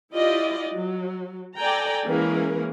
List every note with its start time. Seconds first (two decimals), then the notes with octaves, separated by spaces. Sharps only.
0.13 E4 F4 G4 D5 D#5
0.71 F#3
1.56 A4 D5 G5 G#5 A#5
2.06 E3 G#3 A#3 C#4 G#4 A#4